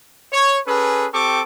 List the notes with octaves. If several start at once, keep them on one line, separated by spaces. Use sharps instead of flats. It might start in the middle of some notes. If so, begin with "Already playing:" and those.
C#5
C#4 G#4 A4 B4
C4 G4 A4 C#6 D6